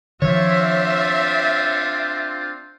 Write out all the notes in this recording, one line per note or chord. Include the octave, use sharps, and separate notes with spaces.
D#3 F3 C4 D4 F4 C#5 E5